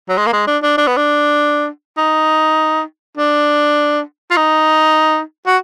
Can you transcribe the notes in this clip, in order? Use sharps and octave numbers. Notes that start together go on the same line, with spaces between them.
F#3
G#3
A#3
G#3
D4
D4
D4
B3
D4
D#4
D4
F4
D#4
F#4